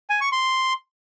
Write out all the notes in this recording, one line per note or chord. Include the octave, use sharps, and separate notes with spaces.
G#5
C#6
C6